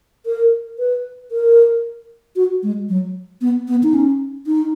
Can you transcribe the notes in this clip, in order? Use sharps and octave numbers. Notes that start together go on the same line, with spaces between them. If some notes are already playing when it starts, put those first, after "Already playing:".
A#4
B4
A#4
F#4
G#3
F#3
B3
B3
D#4
C#4
D#4